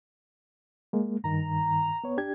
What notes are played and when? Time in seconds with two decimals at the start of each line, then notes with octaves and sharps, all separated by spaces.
0.93 G#3 A#3
1.24 G2 D#3 A#5
2.04 B3 C#5
2.18 D4 G4 G#6